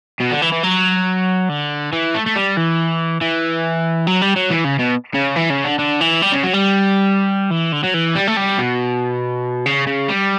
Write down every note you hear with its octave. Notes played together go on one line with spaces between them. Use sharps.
B2
D3
E3
E3
F#3
D3
E3
A3
A3
G3
E3
E3
F#3
G3
F#3
E3
C#3
B2
C#3
E3
C#3
D3
D3
E3
G3
C#3
F#3
G3
E3
D3
F#3
E3
G3
A3
G3
B2
C#3
C#3
G3